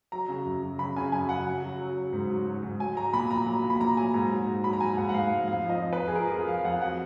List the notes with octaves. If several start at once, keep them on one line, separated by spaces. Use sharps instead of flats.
F#3 A#5
C#3
F#2
F#3
C#3 B5
C#3 G#5
F#2 G#5
C#3 F#5
F#3
F#3
F#3
F#3
G#2
F#3
F#3
G#2
F#3 G#5
F#3 A#5
A#2 B5
A#2 A#5
F#3 A#5
A#2
B5
A#2 A#5
F#3 G#5
G#2 A#5
F#3
G#2
F#3 B5
A#5
F#3 G#5
G#2 F#5
F#5
G#2 F5
G#2
F2 F5
F3
D#5
F2
B4
F2
G#4
F3 A#4
F2 G#4
F2 F5
F2 F#5
F#3 F#5